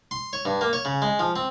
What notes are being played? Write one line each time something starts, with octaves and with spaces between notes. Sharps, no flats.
C6
C#5
G2
A#3
C#5
C#3
G#3
F3
C4